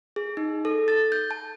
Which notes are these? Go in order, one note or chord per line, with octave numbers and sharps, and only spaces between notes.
G#4
D#4
A4
A6
G6
A5